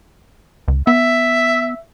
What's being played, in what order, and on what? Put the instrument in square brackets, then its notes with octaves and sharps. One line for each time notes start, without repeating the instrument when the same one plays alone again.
[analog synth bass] C#2
[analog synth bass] B3 [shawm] E5